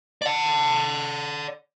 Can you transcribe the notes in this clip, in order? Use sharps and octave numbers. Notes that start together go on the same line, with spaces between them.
D5 F#5